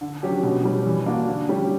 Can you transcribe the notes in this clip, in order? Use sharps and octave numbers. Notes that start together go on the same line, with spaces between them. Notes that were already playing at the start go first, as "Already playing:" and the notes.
D3
F#3 C#4 G4
B2
G3 C#4
E3
A#3 D4 F#4
D3
G3 C#4 G4